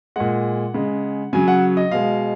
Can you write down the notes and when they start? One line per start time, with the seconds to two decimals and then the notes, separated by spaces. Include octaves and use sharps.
0.16 A#2 G#3 F#5
0.74 C#3 G#3
1.33 C#3 F#3 G#5
1.48 F#5
1.77 D#5
1.91 B2 G#3 F5